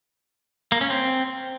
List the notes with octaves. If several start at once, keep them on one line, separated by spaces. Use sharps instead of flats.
A#3
C#4
C4